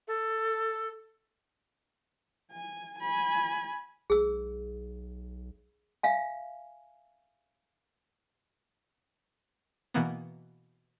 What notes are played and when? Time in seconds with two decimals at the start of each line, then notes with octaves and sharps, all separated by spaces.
0.08 A4
2.52 G#5
2.99 G#5 B5
4.10 B1 G#4 E6
6.03 E5 F5 G#5
9.94 B2 E3 A#3 B3